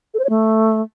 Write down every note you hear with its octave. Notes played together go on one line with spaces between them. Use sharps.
A4
C5
C#5
A3